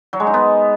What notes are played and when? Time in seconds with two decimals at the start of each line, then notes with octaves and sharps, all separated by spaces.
0.13 F#3
0.20 G#3
0.27 D#4
0.34 B3